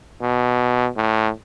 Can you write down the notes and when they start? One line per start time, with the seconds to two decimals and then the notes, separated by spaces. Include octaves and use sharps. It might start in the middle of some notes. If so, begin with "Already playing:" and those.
0.21 B2
0.96 A2